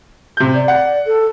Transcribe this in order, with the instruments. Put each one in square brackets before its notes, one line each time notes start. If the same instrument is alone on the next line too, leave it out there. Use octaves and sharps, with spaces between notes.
[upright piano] C3 G6
[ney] D5
[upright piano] F#5
[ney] A4